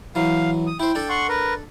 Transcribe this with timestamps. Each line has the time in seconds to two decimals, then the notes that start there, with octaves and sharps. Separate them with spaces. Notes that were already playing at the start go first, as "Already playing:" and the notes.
0.15 E3 F#3 F5
0.67 D#6
0.80 E4 C5 G5
0.95 D4 A4 A5
1.09 F#5 C6 C#6
1.29 A#4 B4